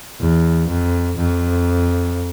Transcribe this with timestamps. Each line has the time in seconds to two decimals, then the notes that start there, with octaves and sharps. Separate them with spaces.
0.21 E2
0.69 F2
1.17 F2